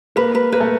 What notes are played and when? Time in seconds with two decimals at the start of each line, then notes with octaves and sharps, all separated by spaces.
0.16 A#3 B4
0.35 B4
0.52 A#3 B4
0.61 A3